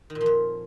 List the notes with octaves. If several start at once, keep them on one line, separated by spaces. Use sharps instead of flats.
D#3
A#2
F3
F2